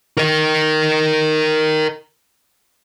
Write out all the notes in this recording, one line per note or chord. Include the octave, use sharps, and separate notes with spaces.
A#4 D#5